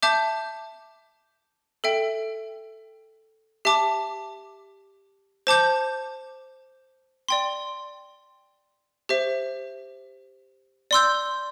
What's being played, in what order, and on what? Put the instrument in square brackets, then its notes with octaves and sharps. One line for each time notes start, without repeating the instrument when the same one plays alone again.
[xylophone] E5 A5 D6 G6
A4 E5 G5
G4 E5 A5 D6
C5 A5 D6 G6
D5 G5 C6
G4 C5 E5
D5 C6 E6 G6